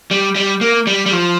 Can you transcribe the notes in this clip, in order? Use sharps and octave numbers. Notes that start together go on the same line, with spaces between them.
G3
G3
A#3
G3
G3
F3